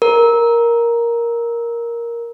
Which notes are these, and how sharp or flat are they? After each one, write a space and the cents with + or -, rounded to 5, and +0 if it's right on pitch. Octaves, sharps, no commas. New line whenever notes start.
A#4 +5